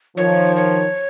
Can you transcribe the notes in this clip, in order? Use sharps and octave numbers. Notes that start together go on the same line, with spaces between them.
D#3 F3 C#5
C#5